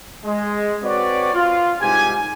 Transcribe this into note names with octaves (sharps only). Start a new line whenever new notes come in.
G#3
C4 F#4 B4 C#5 D5
F4
C2 G#2 G4 G#5